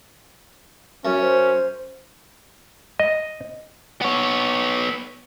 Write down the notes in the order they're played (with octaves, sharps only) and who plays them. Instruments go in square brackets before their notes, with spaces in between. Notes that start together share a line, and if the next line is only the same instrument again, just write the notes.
[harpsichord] F#2 [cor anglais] C#4
[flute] C5
[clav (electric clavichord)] D#5
[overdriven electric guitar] B3 C#5